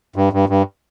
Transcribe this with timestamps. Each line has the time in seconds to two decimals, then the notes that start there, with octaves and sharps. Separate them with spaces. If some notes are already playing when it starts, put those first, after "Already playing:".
0.16 G2
0.33 G2
0.49 G2